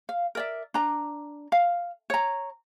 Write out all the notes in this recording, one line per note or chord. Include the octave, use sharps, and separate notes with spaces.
F5
A#4 D5 E5
D4 A#5
F5
C#5 A#5